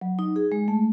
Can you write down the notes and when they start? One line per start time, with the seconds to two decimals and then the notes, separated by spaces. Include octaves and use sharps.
0.01 F#3
0.19 D#4
0.36 G#4
0.52 G#3
0.68 A3